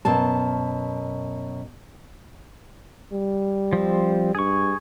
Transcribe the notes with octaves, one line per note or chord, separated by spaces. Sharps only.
F#2 B2 A5
G3
F3 C4
G2 G#4 C#6